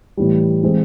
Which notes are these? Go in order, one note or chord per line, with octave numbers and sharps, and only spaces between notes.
A2 E3 G3
E3 G#3 C4